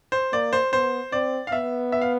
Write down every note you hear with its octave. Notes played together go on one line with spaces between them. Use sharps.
C5
A#3 D5
C5
B3 C5
C4 D5
F5
B3 E5
E5
F5